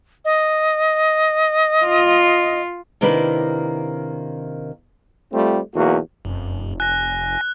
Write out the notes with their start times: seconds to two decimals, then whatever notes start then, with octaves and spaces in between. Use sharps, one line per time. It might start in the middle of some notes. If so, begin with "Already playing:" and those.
0.25 D#5
1.85 F4
3.01 C3 D#3 A#3 D4 E4 B4
5.32 G3 A3 C4 F4
5.74 B1 E2 A#3 F#4
6.25 F1 F#2
6.80 G#5 F#6 A#6